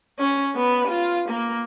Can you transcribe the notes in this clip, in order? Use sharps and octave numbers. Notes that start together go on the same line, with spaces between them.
C#4
B3
F4
A#3